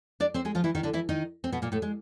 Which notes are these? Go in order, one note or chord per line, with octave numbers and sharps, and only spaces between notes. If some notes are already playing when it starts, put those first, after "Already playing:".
D4 D5
C4 C5
G#3 G#4
F3 F4
E3 E4
D#3 D#4
D3 D4
E3 E4
D#3 D#4
C4
B2 B3
A#2 A#3
A2 A3
G#3